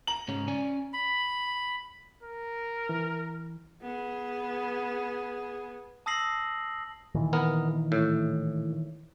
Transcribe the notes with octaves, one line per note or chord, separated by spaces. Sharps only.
A#5 F#7
G#2 C#3 C#4
C#4 D5 G#5
B5
A#4
E3
B3 G#4
A5 D#6 E6 A#6 C7 F#7
A#2 D#3 E3
B3 A#4
A2